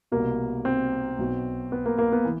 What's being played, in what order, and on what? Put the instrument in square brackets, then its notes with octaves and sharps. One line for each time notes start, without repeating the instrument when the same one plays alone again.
[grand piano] C2 B2 A#3
C4
B1 B2
B3
A#3
A#3
B3
E3